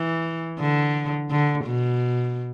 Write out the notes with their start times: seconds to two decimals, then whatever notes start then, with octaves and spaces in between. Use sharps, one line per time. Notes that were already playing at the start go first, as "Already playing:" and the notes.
Already playing: E3
0.60 D3
1.30 D3
1.65 B2